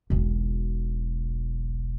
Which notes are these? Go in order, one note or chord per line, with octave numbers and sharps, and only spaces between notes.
E1 B1